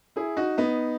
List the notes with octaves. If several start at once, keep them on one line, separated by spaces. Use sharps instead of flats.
E4 G#4
D#4 F#4
B3 D#4